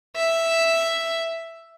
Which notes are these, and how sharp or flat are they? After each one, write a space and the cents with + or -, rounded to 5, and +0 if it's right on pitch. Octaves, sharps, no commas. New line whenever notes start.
E5 +5